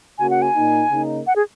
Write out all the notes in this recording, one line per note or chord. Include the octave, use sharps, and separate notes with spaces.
C#3 A#3 C#4 F#4 G#5
F#5
G#5
A#2 A#3 D#4
C#3 A#3 D#4
F#5
G#4